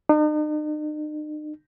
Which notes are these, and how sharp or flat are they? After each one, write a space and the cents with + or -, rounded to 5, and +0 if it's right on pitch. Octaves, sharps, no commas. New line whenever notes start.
D#4 -45